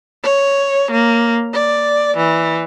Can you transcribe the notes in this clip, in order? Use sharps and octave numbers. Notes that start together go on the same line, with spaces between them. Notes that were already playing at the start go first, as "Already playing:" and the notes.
C#5
A#3
D5
E3